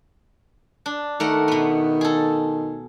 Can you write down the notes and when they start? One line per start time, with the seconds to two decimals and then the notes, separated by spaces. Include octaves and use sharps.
0.86 D4
1.20 D#3 A3 A#4 F#5
1.48 B2 B3
2.01 G#4 A4